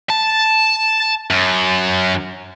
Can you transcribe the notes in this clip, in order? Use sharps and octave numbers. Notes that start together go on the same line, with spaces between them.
A5
F#2